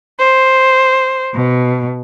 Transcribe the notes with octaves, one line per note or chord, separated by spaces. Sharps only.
C5
B2